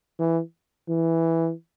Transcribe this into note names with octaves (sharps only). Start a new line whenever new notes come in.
E3
E3